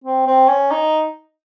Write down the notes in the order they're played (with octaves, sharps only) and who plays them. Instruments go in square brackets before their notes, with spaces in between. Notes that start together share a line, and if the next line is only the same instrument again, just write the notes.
[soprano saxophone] C4
C4
C#4
D#4